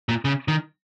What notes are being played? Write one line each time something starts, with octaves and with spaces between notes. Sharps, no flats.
A#2
C#3
D#3